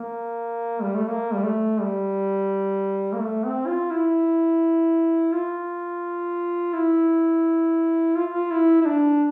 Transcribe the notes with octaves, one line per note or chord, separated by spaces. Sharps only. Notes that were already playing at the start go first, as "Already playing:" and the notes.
Already playing: A#3
G3
A3
A#3
G3
A3
G3
A#3
A3
C4
F4
E4
F4
E4
F4
F4
E4
E4
D4